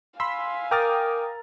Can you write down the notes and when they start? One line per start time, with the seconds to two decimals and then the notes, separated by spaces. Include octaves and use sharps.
0.20 F5 G#5 B5 C6 E6 B6
0.71 A#4 G5 A#5 D6 D#6 F6 A6